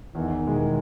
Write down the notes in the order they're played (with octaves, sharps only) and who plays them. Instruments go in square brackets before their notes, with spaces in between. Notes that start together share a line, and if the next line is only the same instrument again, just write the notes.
[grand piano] E2 [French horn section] D#3
[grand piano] B2 G#3